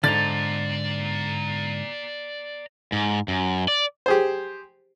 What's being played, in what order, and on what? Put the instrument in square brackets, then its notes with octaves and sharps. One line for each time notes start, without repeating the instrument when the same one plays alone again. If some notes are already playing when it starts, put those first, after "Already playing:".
[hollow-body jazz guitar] G#2 D3 [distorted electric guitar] D5 A#5 [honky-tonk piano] A6
[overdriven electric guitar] G#2
F#2
D5
[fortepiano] G4 G#4 C5